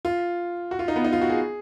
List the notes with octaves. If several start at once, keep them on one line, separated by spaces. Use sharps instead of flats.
F4
F#4
F4
D#4
B3
D#4
F4
F#4
G#4